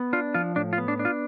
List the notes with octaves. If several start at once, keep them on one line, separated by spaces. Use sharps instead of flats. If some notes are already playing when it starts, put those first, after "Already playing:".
Already playing: B3
D4 F4
F3 F4
A2 D4
F4
B3
D4
D4
F4